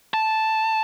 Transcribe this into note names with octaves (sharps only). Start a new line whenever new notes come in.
A5